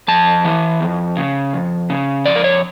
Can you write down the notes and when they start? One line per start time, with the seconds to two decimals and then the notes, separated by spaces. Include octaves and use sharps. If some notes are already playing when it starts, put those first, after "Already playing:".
0.08 F2 A5
0.45 E3
0.81 F2
1.17 C#3
1.53 F2
1.90 C#3
2.26 F2 D5
2.36 A#4
2.44 C#5